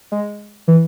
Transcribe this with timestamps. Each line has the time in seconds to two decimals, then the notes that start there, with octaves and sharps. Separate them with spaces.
0.12 G#3
0.68 E3